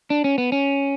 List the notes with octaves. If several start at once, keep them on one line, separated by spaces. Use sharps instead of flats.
D4
C#4
B3
C#4